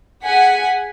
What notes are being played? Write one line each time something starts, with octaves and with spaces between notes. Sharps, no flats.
G#4 F#5 G#5 B6